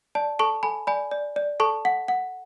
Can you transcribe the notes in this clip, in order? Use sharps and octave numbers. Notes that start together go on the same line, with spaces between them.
D5 A5
A4 A5 C#6
A4 G#5 B5
D5 G#5 B5
D5
D5
A4 A5 C#6
F#5
F#5